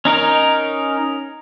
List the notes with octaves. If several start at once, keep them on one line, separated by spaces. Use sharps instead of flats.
C#4 D#4 A#4